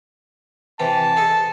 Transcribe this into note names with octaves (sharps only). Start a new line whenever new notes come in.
C3 E3 G4 A5
G#4 A4 D#5